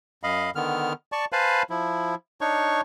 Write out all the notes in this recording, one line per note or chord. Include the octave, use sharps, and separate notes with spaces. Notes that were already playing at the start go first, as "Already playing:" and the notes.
F#2 D#5 F5 B5
D3 D#3 B3 F6
D5 A5 C#6
B4 C5 F5 G#5 A5 B5
F3 E4
D4 D#4 C#5 C#6